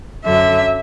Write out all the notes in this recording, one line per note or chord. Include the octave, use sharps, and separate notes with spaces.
F#2 D3 F#3 E5